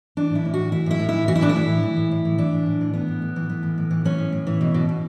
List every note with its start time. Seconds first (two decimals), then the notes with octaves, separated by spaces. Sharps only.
0.17 E3 D4
0.30 A2 E4
0.45 A2
0.54 F#4
0.59 E3
0.72 E3 E4
0.86 A2
0.91 E4
0.99 A2
1.09 E3 E4
1.28 E3 F#4
1.36 E4
1.41 A2 D4
1.49 E4
1.56 A2
1.69 E3
1.83 E3
1.96 A2
2.12 A2
2.25 E3
2.38 E3 D4
2.53 A2
2.66 A2
2.81 E3
2.94 E3 B3
3.08 A2
3.22 A2
3.36 E3
3.49 E3
3.63 A2
3.78 A2
3.91 E3
4.05 E3 C#4
4.18 A2
4.32 A2
4.47 E3
4.61 B2
4.74 B2
4.89 B2